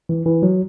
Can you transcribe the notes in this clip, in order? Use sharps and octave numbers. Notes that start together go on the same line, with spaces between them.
E3
E3
F#3